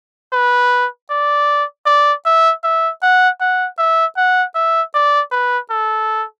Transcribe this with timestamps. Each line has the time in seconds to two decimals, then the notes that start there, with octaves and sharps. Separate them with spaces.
0.33 B4
1.10 D5
1.86 D5
2.26 E5
2.64 E5
3.02 F#5
3.41 F#5
3.79 E5
4.17 F#5
4.55 E5
4.94 D5
5.32 B4
5.70 A4